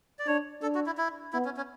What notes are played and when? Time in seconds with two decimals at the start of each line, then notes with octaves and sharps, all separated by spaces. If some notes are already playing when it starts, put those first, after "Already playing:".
0.19 D5
0.27 D4 C#5
0.62 D4 A4
0.75 F#4
0.86 E4
0.98 E4
1.33 B3 E4
1.45 C#4
1.57 C#4